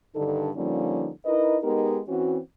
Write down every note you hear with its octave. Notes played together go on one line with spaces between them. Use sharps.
G2 D3 D#3 D4 D#4 A4
D3 F3 G3 A#3 C#4 D#4
D#4 E4 A#4 B4 D#5
G#3 B3 D#4 G4 A#4
E3 C4 C#4 F#4